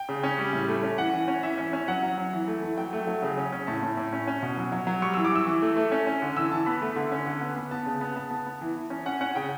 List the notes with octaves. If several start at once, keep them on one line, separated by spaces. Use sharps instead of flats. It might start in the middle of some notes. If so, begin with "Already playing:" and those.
Already playing: G5
C#3
C#4
G3
A2
A3
C#4
E3 F#5
E3
C#4
E3 E5
C#4 E5
C#4
F#3 F#5
F#3
F#3
E3
A3
E3
F#3 G5
A3
F#3
C#3
C#4
C#4
A2 A5
A2
A2
C#4
C#4
B2
F#3
F#3
F#3
G3 C#6
E3 E6
D6
E3 E6
E3
A3
A3
C#4
C#4
D3
E3 E6
E3 A5
B3 B5
A3
D3
C#4
D3
B3
B3
B3 A5
C#3
B3
B3 A5
B3
B3
E3
E3
C#4
C#4 F#5
C#4 F#5
C#3 G5